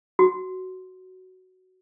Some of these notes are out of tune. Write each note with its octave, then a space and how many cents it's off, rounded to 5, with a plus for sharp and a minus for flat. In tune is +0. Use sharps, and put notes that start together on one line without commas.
F#4 +5